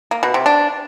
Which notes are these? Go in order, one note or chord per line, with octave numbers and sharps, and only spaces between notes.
A#3
B2
C3
D4